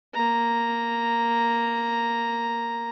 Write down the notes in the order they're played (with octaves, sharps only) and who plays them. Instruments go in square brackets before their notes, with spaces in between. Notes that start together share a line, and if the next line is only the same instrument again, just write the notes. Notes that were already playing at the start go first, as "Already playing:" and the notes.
[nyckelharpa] A#3 A#5